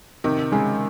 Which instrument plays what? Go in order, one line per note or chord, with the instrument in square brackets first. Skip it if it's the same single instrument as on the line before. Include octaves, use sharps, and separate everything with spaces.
[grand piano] C3 [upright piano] D#3
[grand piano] C#3 [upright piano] G#3